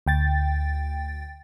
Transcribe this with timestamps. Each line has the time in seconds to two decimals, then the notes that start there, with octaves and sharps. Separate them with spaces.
0.06 D2 G5 A6